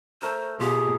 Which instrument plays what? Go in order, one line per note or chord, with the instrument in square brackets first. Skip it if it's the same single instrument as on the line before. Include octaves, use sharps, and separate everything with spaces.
[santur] A3 A#4 E6 [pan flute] C5
[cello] B2 [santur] F4 [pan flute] G4 [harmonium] G#4